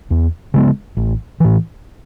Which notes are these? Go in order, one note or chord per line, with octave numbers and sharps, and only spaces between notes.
E2
C#3 G#3 B3
A1
A2 E3